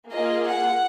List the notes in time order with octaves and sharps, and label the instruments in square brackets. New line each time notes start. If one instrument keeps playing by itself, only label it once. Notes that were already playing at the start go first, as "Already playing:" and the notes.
[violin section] A#3 F4 G#4 [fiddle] D#5
[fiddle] F#5